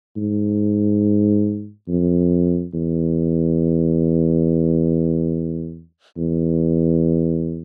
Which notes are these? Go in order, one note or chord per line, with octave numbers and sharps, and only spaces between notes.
G#2
F2
E2
E2